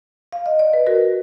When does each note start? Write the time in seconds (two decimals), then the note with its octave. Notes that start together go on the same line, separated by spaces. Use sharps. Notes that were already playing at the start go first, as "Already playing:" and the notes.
0.33 F5
0.46 D#5
0.59 D5
0.73 B4
0.86 F#4 A#4